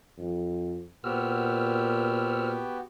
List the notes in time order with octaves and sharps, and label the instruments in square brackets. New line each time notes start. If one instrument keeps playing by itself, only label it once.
[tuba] F2
[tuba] A#2 [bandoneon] B3 F#4 G4 [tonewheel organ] C5 E6 F6